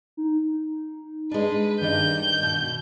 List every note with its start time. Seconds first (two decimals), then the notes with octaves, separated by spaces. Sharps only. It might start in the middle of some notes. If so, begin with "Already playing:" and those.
0.17 D#4
1.31 G#3 D4 B4
1.81 G2 D#3 D4 D#4 G6
2.43 B2